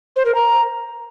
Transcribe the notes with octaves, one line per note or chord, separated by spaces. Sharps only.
C5
A#4
A#5